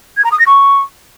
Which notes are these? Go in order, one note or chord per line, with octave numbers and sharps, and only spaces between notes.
G#6
A#5
D#6
A#6
C#6